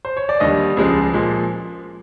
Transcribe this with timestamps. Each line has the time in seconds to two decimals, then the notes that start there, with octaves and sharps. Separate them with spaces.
0.05 C5
0.17 C#5
0.29 D5
0.40 D#2 D3 G3 D#5
0.77 C#2 C#3 F3 G#3
1.14 A#2 F3 G#3